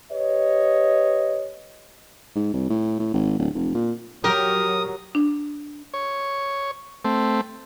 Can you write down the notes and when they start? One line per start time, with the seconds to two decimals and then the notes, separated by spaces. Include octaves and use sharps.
0.12 G4 B4 C#5 D#5
2.35 G#2
2.54 C2
2.70 A2
2.99 A2
3.13 G#1
3.39 D1
3.55 F1
3.74 A#2
4.24 F#3 G4 A#4 D#6
5.15 D4
5.94 C#5
7.04 A3 C4